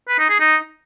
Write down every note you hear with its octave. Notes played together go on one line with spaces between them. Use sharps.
B4
D#4
G#4
D#4